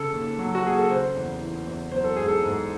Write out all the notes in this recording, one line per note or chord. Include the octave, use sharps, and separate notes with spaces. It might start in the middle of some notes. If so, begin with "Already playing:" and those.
Already playing: C#3 A4
D#2
F#3
F#4
D#2 G#4
A4
C#3 C5
E2
E3
E2
F#3 C5
A4
G#2 G#4
A4
G#2